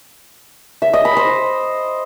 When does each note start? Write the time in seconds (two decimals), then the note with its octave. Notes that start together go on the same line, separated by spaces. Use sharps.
0.82 E5
0.93 D#5
1.05 B5
1.17 C5